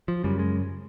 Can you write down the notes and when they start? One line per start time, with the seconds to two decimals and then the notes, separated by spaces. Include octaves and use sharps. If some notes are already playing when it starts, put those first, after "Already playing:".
0.08 F3
0.24 F#2 C#3 G3
0.39 G#3